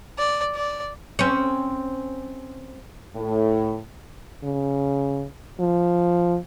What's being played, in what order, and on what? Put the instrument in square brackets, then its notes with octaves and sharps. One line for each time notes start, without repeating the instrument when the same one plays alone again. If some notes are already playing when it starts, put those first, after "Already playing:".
[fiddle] D5
D5
[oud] C4 C#4
[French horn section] A2
[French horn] C#3
F3